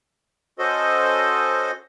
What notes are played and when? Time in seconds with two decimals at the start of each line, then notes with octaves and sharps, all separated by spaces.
0.59 C#4 F#4 A4 C5 D#5